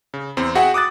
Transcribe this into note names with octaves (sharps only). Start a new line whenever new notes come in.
C#3
E2 C4
F#4 G#4 E5 F#5 G5
D6 D#6 F#6 A6